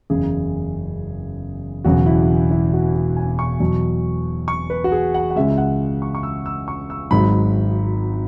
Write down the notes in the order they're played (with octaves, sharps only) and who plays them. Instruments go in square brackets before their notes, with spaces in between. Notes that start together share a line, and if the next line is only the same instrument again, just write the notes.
[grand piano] F#1 E2 C#3 G#4
E1 E2 C#3 F#3 F#4
E4
E4
F#4
F#4
G#5
C#6
E2 B2 F#3
C#6
B4
F#4
G#4
F#5
F#5
C#2 C#3 G#3 E5
F#5
C#6
C#6
E6
E6
C#6
E6
G#1 G#2 F#3 B5